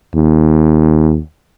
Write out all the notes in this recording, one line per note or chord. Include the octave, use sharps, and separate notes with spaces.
D#2